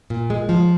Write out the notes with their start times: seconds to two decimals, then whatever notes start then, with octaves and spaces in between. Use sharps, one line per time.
0.10 A#2
0.30 G#3
0.49 F3